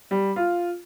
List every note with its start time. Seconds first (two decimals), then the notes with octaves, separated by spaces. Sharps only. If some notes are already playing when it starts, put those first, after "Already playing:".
0.11 G3
0.36 F4